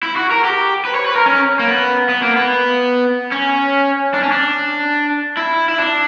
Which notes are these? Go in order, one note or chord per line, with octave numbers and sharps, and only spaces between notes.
E4
F#4
A#4
G4
B4
C#5
B4
A#4
C#4
A#3
B3
B3
A#3
B3
C#4
D4
C#4
D4
E4
E4
D4